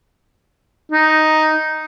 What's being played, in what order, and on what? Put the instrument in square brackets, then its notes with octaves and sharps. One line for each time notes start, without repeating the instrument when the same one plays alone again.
[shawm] D#4